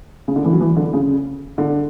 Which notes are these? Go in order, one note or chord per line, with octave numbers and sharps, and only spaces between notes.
C#3
D3
E3
F#3
E3
D3
C#3
D3